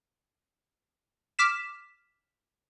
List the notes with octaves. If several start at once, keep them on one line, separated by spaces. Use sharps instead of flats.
D6 F6 B6 E7